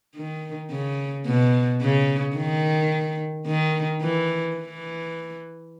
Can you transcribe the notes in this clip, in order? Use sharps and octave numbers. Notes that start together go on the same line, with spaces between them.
D#3
C#3
B2
C#3
D#3
D#3
E3
E3